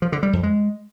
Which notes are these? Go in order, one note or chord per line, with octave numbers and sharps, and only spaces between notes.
F3
D3
G3
F2
G#3